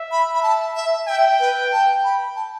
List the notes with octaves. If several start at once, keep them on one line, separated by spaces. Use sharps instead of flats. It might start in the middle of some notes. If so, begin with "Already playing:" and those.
Already playing: E5
B5
B5
A5
E5
E5 G5
B4
A5
B5
A5